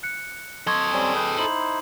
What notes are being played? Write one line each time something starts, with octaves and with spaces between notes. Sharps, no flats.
F#6 C#7
A4 D#5 C6 C#6 G#6
G3 C4 C#4
G#4 B4 G5
D#4 E4 C5 F#7